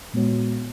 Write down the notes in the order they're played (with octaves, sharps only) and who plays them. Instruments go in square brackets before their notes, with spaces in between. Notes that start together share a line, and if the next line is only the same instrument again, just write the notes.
[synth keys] A#2 G#3 B3 F#4 C#5